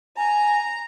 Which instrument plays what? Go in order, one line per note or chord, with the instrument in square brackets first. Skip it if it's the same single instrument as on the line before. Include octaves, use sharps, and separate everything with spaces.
[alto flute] G#5 [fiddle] A#5